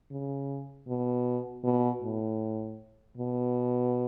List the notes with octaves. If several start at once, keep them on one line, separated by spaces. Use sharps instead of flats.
C#3
B2
B2
A2
B2